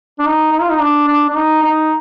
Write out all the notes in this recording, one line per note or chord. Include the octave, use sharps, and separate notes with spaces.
D4
D#4
D#4
F4
D#4
D4
D4
D4
D#4
D#4